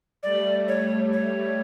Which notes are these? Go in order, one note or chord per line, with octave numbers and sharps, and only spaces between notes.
G3 A3 D5
C#5
C#5